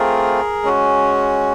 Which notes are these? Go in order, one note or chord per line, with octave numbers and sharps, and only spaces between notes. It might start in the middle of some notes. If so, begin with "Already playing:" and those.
Already playing: A3 C4 F4 G#4 A#4
G#3 C#4 F#4